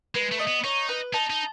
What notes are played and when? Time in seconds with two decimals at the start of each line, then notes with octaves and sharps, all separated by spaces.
0.15 G#3 B4
0.32 A3
0.39 D#5
0.47 B3
0.64 D#4 C#5
0.89 B4
1.14 D#4 A5
1.30 D#4